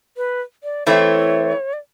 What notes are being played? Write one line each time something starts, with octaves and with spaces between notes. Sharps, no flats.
B4
D5
E3 A3 C4 E4 C#5
D5